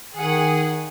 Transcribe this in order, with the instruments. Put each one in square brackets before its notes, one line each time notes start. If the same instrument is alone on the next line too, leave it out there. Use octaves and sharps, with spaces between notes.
[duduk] D#3 [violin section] G#4 F#5